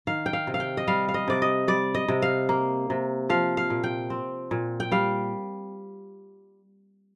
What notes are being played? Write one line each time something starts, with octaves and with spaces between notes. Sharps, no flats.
D#3 F5
G5
F5
C3
F5
G5
D#5
G3 F5
F5
D#5
C3 D5
D#5
G3 D5
D#5
C3
F5
A#3
C3
F3 F5
F5
A#2
G5
C4
A#2
G5
G3 F5